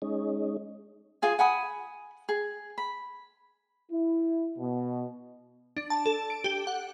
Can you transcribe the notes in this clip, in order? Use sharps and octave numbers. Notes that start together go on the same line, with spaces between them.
G#3 C#4 D#4
F4 G#4 G#5
F#5 G#5 B5 D#6
G#4
B5
E4
B2
D4
A5
A4
D7
G4
F#5